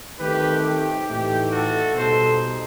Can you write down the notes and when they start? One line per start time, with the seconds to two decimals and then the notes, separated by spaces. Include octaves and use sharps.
0.19 D#3 A3 C4 D#4 G4 B4
0.63 G4
1.07 A2 E3 A3 D#4 G4
1.51 F#4 A4
1.95 B2 G3 D#4 A4 C5